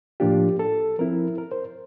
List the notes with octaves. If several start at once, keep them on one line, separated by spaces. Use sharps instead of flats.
A2 F3 A#3 D4 F4 G4
A4
F3 C4 E4 A#4
A#4
C5